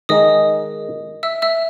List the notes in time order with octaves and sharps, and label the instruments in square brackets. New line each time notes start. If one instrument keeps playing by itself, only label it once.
[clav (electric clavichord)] D#3 G#3 D#4 [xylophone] D#5 D#6
[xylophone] E5 E6
E5 E6